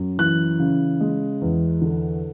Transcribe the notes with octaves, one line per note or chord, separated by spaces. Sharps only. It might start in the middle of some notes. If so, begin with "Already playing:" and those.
Already playing: F#2
E3 F#6
C#3
G#3
E2
D3